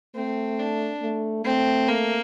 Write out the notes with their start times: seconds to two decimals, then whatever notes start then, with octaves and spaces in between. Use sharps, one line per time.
0.15 A3 C4
0.59 D4
1.01 A3
1.44 A3 C4
1.88 A#3